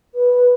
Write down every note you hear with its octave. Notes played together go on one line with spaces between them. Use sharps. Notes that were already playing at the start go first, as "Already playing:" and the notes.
B4